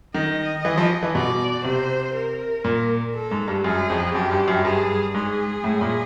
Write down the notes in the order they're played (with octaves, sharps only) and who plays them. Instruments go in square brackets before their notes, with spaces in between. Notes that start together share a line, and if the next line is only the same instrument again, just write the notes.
[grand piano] D#3 [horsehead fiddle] D#5
[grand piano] E3
F3
E3
[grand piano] B2 [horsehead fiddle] D5
[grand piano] C3 [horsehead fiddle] C5
[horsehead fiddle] A#4
[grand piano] A#2
[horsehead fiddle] A4
[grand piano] G#2
G2
[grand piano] F#2 [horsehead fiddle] G#4
[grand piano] F2
[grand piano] F#2 [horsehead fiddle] G4
[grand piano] G2
F#2
[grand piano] G2 [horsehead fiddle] G#4
[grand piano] G#2 [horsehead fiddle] G#4
[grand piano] A2
A#2